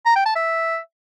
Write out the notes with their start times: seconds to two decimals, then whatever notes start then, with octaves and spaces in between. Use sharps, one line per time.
0.05 A#5
0.15 G5
0.25 A5
0.36 E5